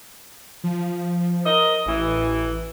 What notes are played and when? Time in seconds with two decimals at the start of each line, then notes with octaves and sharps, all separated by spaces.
0.64 F3
1.45 A#4 D#5
1.86 A1 E3